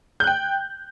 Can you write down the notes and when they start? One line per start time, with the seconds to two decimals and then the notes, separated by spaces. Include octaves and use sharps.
0.20 G6
0.24 F#6
0.27 G5